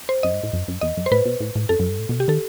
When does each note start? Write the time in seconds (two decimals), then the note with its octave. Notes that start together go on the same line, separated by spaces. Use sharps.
0.09 C5
0.23 F#2 D#5
0.33 G2
0.43 A2
0.53 F#2
0.68 F#2
0.81 E2 D#5
0.97 F#2
1.06 C5
1.11 A2 B4
1.25 B2
1.40 A2
1.56 A2
1.69 F#2 A4
1.79 F#2
1.89 G2
1.99 A2
2.09 B2
2.19 C3 G4
2.28 D#3 A4